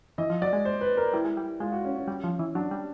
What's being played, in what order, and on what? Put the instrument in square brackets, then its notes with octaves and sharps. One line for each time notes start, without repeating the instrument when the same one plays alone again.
[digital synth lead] E3 [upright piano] D#5
[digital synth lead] F3
[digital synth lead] F#3 [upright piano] D5
[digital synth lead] G#3
[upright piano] C5
B4
A#4
[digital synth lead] G3 [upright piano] E4
[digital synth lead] G#3
G3
[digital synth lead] G#3 [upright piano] F4
[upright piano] F#4
C#4
C#4
[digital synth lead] G3
F3
E3
[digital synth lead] F#3 [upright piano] D4
[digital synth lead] G3